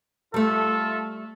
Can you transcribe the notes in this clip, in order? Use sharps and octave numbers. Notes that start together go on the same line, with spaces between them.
G3 A3 F4 A4 E5